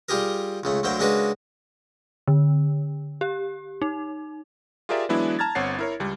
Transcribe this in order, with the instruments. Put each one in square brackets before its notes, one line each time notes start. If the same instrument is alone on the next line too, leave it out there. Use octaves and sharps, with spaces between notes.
[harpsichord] G3 F4 G4 G#4 A#4
C#2 C#3 A3
D2 F#3 A3 A#3 C5 G5
C#3 G#3 A#3 D4 F#4 B4
[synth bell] D3
G4
D#4
[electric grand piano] F4 G4 G#4 A#4 D5 E5
E3 F#3 G#3 B3 D4 E4
A5 A#5 F6 G#6 A6
G1 C4 C#5 F#5 A6 C7
E4 A#4 C#5
C#2 G3